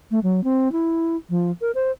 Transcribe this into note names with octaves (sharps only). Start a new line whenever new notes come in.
A3
F#3
C4
E4
F3
A#4
C5